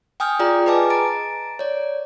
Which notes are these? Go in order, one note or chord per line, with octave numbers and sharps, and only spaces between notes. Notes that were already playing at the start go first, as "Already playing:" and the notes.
G5 G#5 D#6 F6 G6
F4 G#4 D5 G5 A#5
G#4 B4 D#5 G#5 A5 D6
A#5 A6 D7
C#5 D5